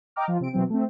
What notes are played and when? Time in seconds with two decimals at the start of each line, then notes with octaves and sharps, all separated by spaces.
0.16 D#5 G5 A#5 D6 F6
0.28 F3 F4
0.40 C3 C4 D7
0.53 B2 E3 F#3 C4
0.70 A3 C4